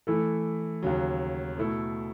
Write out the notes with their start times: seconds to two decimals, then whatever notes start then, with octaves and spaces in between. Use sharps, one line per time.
0.07 E3 A3 E4 A4
0.82 D#2 C#3 F#3
1.57 B2 A3 E4 A4